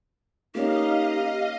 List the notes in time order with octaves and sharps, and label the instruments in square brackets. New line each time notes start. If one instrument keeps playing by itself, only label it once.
[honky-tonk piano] A#3 C#4 [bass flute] D#4 [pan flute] G4 [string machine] D#5 F5